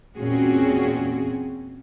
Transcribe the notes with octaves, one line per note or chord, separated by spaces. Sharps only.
E2 A#2 C4 C#4 F#4 G#4